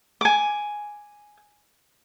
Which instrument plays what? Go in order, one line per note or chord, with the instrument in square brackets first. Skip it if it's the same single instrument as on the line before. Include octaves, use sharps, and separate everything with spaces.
[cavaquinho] G#5 D6